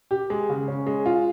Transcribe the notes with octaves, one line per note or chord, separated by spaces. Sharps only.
G4
G#3
C#3
C#4
G#3
F4